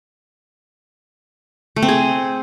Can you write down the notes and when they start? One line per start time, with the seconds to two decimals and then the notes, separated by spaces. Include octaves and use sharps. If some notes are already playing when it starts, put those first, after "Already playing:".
1.76 A3
1.82 C4
1.88 G#4